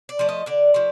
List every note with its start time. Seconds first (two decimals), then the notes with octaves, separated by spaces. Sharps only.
0.09 D5
0.19 F3 A3
0.29 D#5
0.46 D3 D5
0.74 F3 A3